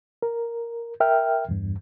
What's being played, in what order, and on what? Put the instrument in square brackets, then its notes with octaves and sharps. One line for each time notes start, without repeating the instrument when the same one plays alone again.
[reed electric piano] A#4
A#4 E5 G5 F6
E2 G2